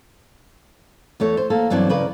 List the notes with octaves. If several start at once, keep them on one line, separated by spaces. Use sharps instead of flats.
E2 A3 C#5
C5
A#3 A4
G2 E3 F#3 B3 C4 D4
C#3 A#4 B4 D5